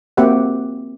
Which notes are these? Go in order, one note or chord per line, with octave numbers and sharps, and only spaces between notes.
A#3 C4 F#4 G4 E5 F#5